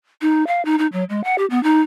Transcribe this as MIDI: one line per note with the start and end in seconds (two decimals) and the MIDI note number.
0.22 0.46 63
0.47 0.63 77
0.65 0.78 63
0.78 0.87 63
0.93 1.04 54
1.09 1.24 56
1.24 1.36 78
1.38 1.46 67
1.50 1.62 59
1.63 1.81 63